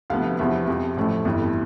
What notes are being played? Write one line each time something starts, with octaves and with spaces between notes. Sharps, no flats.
D2 C3 F3 B3 F5
E2 C3 F3 B3 E5
F2 C3 F3
A1 A2 F3 A3
G1 F2 E3 G3